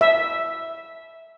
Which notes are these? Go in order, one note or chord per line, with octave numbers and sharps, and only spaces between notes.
E5